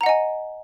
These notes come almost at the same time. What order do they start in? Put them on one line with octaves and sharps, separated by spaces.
A#5 F#5 D#5 G#5